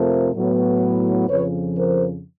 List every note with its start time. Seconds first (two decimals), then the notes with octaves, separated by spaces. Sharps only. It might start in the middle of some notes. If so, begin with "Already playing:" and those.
Already playing: F2 C3 F3 A3 A#4 C5
0.34 A2 F#3 B3
1.28 F2 C#3 F3 B4 C#5
1.76 A#4 C5